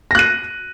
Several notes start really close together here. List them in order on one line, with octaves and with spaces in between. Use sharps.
A#6 F#6 D#7